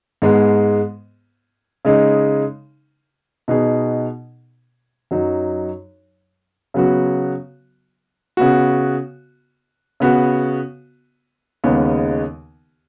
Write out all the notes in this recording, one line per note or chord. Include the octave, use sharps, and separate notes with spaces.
G#2 G#3 B3 G#4
C#3 G#3 D#4
B2 B3 D#4 G#4
F#2 F#3 D#4
C#3 F#3 B3 F#4
C#3 B3 F#4
C#3 B3 F#4
D#2 C#3 G#3 B3 D#4